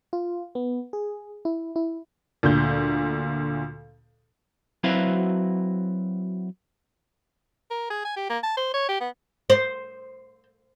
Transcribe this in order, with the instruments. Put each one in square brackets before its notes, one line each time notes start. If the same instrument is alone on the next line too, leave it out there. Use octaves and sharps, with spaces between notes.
[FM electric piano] F4
B3
G#4
E4
E4
[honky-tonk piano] D2 A#2 G6
[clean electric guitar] F#3 C4 E4 F#4 B4 F5
[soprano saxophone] A#4
G#4
G#5
G4
A#3
A5
C5
C#5
G4
B3
[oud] C5